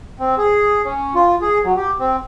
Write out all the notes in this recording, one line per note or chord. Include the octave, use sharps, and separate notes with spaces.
C4
G#4
C#4
F4
G#4
F#3
G4
C4